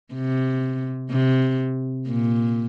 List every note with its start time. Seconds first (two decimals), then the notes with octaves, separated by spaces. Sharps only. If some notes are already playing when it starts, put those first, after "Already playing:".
0.14 C3
1.11 C3
2.08 A#2